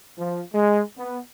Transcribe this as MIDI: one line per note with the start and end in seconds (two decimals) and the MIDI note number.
0.18 0.43 53
0.54 0.82 56
0.98 1.19 59